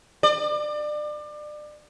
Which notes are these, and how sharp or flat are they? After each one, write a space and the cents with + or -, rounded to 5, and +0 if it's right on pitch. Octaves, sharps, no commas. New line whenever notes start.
D5 +30